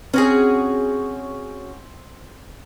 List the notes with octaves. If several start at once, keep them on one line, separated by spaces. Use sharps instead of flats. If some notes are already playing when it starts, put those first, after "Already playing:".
C4 C#4 F#4 G#4